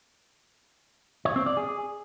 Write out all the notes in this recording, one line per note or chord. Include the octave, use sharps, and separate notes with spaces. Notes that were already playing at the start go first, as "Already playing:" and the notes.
C#5
C4
D5
G#4